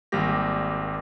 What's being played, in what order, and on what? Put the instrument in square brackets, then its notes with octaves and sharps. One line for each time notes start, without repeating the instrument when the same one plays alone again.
[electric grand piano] G#1 G3 A#3 G4 A#6